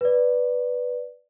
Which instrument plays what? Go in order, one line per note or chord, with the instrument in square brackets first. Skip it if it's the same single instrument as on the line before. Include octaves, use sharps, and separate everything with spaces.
[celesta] B4 D5